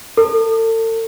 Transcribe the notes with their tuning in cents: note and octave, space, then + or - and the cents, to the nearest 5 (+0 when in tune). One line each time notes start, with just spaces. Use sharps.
A4 +40